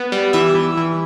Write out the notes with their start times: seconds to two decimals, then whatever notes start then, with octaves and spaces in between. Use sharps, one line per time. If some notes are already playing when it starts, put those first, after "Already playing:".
Already playing: B3
0.12 G3
0.33 E3 E5
0.55 E3
0.77 E3